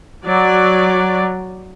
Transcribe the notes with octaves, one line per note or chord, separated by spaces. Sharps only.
F#3 D5